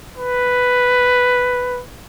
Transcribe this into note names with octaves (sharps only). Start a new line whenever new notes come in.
B4